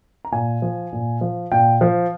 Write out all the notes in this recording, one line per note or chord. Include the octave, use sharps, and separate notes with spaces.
A#5
A#2 G#5
F3
A#2
F3
A#2 G5
F3 F5